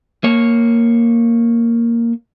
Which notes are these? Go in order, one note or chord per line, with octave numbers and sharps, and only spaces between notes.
A#3 C#5